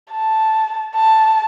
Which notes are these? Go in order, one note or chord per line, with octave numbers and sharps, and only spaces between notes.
A5
A5